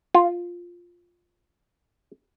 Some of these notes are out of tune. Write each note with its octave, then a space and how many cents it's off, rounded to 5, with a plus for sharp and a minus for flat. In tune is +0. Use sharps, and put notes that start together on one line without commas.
F4 +5